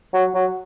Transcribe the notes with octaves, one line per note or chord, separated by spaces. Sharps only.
F#3
F#3